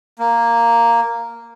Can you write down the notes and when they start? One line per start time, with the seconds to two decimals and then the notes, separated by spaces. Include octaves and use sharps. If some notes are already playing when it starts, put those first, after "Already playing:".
0.19 A#3